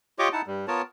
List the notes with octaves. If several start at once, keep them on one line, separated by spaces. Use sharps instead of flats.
F4 G4 C#5 D#5 C#6 D6
D#4 E4 F#5 A5
G2 G3
B3 F4 A#4 C#5 A5